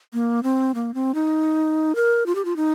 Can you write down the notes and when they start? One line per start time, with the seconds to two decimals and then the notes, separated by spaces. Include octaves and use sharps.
0.13 A#3
0.43 C4
0.75 A#3
0.94 C4
1.15 D#4
1.95 A#4
2.26 F4
2.35 G4
2.45 F4
2.56 D#4